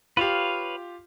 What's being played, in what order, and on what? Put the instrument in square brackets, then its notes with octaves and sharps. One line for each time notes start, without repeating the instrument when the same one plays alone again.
[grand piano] F4 G4 [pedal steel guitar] B4 C#5 F5